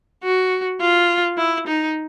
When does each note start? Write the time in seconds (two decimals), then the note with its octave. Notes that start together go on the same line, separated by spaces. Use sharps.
0.23 F#4
0.80 F4
1.38 E4
1.67 D#4